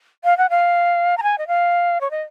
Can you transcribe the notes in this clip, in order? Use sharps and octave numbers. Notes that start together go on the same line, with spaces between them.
F5
F#5
F5
A#5
G#5
D#5
F5
C#5
D#5